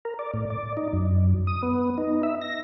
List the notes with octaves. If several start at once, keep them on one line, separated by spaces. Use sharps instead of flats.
A#4
D5
A2
D5
D#4
F#2
D#6
B3
D#4
E5
A#6